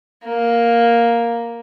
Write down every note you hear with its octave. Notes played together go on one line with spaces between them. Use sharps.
A#3